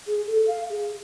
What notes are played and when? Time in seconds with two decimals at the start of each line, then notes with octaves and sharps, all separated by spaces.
0.07 G#4
0.27 A4
0.48 F5
0.70 G#4